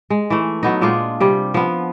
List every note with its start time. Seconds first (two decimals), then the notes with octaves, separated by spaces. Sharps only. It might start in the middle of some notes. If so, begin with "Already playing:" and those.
0.10 G#3
0.30 E3 A3
0.63 F#3 B3 D#4
0.81 A#2 G#3 D4 F4
1.20 C3 G3
1.54 F3 B3